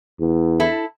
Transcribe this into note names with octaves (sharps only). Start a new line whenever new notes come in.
E2
E4 A4